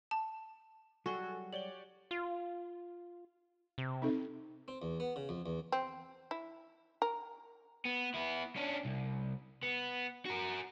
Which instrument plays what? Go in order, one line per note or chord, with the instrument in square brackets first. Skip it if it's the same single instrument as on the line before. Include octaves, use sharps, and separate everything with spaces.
[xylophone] A5
[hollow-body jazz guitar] F#3 G3 G#4 [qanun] F#4 [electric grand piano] A4 G#5 [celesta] C#6 G7
[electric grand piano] G4 C#5 D5 [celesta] F#7 G7
[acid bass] F4
C3
[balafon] C4 D#4 A4
[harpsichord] C4
E2
B3
C#3
F2
E2
[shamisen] C4
E4
A#4
[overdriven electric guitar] B3
B3 E4
C#4 D4
C2
B3
F#4 A#4